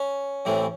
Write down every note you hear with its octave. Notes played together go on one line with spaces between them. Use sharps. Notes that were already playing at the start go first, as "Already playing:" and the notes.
Already playing: C#4
A1 A2 E3 A3 C4